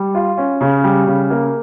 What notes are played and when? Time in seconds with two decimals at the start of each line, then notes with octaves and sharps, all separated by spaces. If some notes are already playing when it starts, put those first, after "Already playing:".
Already playing: G3
0.15 F4
0.37 C#4
0.61 C#3
0.84 G3
1.07 C#3
1.30 A#3